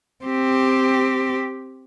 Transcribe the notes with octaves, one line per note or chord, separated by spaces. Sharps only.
C4 G4